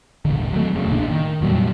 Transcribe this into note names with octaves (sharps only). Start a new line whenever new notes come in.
D#1 G#1 D3
F#3 A3
F1 F#2 C#3
A1 A2 A#3 D4
D#3
F1 A#2 F#3 G3